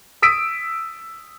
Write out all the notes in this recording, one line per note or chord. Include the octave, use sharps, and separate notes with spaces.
D#6 E6 B6 D7